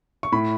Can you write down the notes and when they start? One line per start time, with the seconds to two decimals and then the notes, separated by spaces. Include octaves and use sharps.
0.23 C#6
0.32 A2 B5